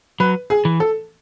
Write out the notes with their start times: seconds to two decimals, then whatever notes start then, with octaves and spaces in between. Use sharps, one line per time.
0.20 F#3 B4
0.50 G#4
0.65 E3
0.80 A4